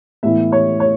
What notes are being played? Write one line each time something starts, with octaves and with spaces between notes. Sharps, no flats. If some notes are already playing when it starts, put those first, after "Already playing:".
A2 E3 B3 E4 E5
C#5
C#5